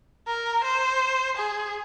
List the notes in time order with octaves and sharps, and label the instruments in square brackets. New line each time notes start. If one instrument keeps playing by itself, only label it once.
[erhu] A#4
C5
G#4